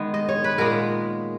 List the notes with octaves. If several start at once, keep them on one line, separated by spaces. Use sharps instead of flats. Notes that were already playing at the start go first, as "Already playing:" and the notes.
Already playing: D#3 G#3 B3
D#5
C#5
B4
A#2 G#3 B3 A#4